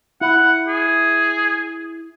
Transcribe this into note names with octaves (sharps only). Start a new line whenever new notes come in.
E4 F#5
G#4